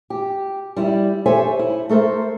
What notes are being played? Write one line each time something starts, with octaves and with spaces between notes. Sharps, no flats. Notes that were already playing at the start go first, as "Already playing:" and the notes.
G4
G3 E4 D5
G4 A4 C5 C#5 E5 G#5
E4
A3 A4 A#4 C5